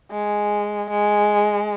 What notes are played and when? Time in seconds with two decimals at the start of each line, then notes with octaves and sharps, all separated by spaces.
0.11 G#3
0.90 G#3